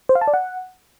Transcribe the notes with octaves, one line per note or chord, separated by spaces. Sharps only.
C5
F5
A5
D5
F#5